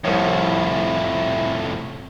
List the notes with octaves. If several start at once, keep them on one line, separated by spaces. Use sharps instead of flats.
C2 F2 A2 E4 C#5